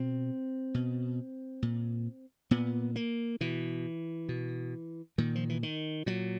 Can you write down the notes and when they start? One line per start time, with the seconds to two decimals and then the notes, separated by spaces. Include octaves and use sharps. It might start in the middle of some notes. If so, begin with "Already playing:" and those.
Already playing: B2 C4
0.74 B2
1.62 A#2
2.51 A#2 B3
2.96 A#3
3.41 B2 E3
4.29 B2
5.18 A#2 D#3
5.35 F3
5.49 E3
5.63 D#3
6.06 A#2 F#3